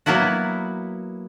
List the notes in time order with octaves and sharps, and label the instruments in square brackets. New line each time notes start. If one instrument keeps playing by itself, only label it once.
[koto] F#3 A#3 B3 E4 F#4